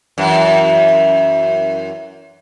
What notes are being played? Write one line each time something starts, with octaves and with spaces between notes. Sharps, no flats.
F#2 E3